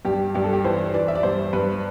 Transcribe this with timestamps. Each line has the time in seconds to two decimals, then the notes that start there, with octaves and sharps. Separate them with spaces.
0.05 G2 G4
0.34 G2 G4
0.44 A4
0.53 G4
0.64 E3 C5
0.94 E3 D5
1.08 E5
1.15 D5
1.23 G2 C5
1.53 G2 B4